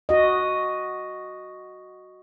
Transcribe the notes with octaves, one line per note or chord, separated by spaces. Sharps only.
F#4 D#5